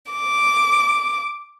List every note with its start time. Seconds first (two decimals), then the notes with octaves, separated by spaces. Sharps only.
0.11 D6